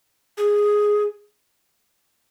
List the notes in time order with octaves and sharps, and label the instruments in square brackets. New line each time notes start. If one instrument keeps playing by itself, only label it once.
[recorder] G#4